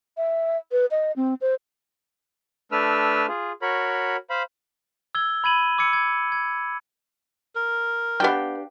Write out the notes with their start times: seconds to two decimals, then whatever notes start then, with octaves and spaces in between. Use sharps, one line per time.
0.17 E5
0.72 B4
0.91 D#5
1.16 C4
1.41 C5
2.72 A3 D4 B4 E6 F6
3.28 F4 G#4
3.62 F#4 A#4 C#5 B5
4.30 C5 F5 B5
5.15 E6 G#6 G7
5.44 B5 G#6 D#7 F#7
5.78 D6 E6 G#6 C#7
5.93 G#6
6.32 G#6
7.55 A#4
8.20 B3 D4 G4 F5 G5